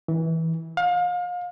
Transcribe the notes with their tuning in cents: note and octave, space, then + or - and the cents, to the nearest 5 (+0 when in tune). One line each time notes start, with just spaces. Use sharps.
E3 -20
F5 +35